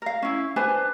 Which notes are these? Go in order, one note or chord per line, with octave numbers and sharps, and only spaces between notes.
A#4 F5
C#4 E4
D4 B4 C5 G#5